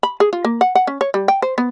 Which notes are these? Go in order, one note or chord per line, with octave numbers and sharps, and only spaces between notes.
B5
G#4
F4
A#3
F#5
F#5
C#4
C#5
G3
G5
C5
B3